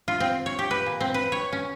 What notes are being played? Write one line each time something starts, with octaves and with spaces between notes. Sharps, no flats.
F4
C4
C#5
G4
B4
A#2
C4
B4
C#5
C#4